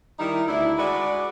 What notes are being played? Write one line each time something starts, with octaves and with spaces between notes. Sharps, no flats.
D#3 G3 D#4 E4
D2 D4 E4
G#3 F#4 B4 D5